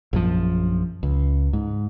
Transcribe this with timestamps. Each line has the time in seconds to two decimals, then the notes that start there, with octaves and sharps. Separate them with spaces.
0.13 A#1 F#2 F3
1.03 C#2
1.53 G#2